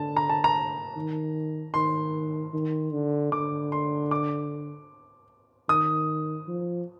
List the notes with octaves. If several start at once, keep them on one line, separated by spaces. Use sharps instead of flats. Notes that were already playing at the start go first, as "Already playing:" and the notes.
Already playing: D3 A5
A#5
A5
A#5
D#3
D#3 C6
D#3
D3
D3 D6
C6
D6
D#3 D#6
F3